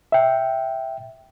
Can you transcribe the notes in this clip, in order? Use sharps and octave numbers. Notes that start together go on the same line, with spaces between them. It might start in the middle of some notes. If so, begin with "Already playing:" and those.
E5 G5